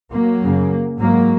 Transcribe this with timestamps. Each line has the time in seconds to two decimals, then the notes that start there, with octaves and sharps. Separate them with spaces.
0.13 F#3 A#3
0.42 F#2 C#3
0.99 G#2 F#3 A#3